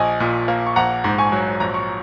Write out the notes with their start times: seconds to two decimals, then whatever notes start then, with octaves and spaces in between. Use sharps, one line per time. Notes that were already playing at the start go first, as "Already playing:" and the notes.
Already playing: A#1 D#5 G#5
0.20 A#2
0.48 A#3
0.67 C#6
0.76 A#1 F#5 A#5
1.04 G#2
1.18 G#5 C#6
1.32 F#3
1.60 A#1 A#5
1.74 C#6